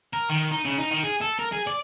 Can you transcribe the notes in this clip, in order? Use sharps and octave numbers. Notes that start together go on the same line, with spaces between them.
A#4
D#3
D#4
C#3
D#4
D#3
G#4
A4
A#4
G#4
D5